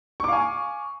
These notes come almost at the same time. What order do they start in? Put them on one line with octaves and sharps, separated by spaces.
C#6 D6 F5 G#5